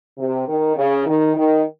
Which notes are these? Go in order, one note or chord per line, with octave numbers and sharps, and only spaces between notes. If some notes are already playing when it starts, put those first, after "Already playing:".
C3
D#3
C#3
D#3
D#3